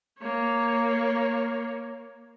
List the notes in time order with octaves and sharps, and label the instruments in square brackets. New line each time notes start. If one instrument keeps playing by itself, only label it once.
[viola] A#3 C#5